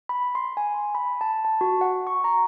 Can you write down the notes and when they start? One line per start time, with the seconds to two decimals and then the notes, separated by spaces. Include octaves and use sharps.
0.09 B5
0.35 C6
0.57 G#5
0.95 B5
1.21 A5
1.45 A5
1.61 F#4
1.81 F#5
2.07 C#6
2.24 A#5